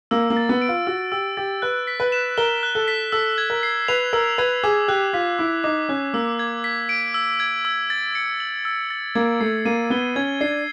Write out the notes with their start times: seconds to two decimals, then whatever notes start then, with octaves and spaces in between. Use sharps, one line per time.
0.11 A#3 E6
0.30 A#3
0.37 A6
0.49 B3
0.62 D7
0.68 F4
0.87 F#4 E6
1.12 G4 E6
1.37 G4 A6
1.62 B4 F#6
1.87 B6
2.00 B4
2.12 E7
2.37 A#4 G7
2.63 F#6
2.75 A4
2.88 B6
3.12 A4 E6
3.38 G#6
3.50 A#4
3.63 C7
3.88 B4 F7
4.13 A#4 E6
4.38 B4 G#6
4.64 G#4 D6
4.88 G4 F#6
5.13 F4 B6
5.39 E4 D6
5.64 D#4 D6
5.89 C#4 F#6
6.14 A#3 E6
6.39 G#6
6.64 B6
6.89 D7
7.14 E6
7.40 G#6
7.65 E6
7.90 A6
8.15 C#7
8.40 F#7
8.65 E6
8.90 A6
9.15 A#3 G#6
9.40 A3 C7
9.65 A#3 D#7
9.90 B3 G7
10.16 C#4 G#6
10.41 D4 C7